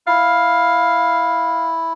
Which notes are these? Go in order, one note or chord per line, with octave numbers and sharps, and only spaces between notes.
E4 F5